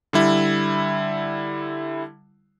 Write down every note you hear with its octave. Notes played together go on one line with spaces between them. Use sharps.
D3 G3 E4